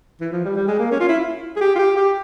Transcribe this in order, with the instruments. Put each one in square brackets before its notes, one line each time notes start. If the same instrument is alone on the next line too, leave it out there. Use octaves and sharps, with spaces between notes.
[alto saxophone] E3
F3
G3
G3
G#3
A#3
C#4
F4
E4
G#4
G4
F4
G4
G4